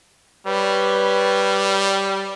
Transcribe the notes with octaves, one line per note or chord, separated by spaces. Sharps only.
G3 B4 C#5